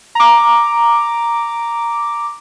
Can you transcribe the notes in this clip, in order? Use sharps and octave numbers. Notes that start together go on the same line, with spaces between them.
A#5 D6